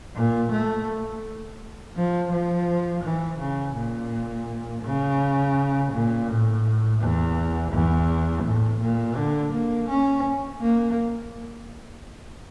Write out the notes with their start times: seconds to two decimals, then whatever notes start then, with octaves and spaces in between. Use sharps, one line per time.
0.16 A#2
0.51 A3
1.96 F3
2.32 F3
3.04 E3
3.40 C#3
3.76 A#2
4.84 C#3
5.92 A#2
6.28 A2
7.00 E2
7.72 E2
8.44 A2
8.81 A#2
9.16 D3
9.53 A#3
9.89 C#4
10.61 A#3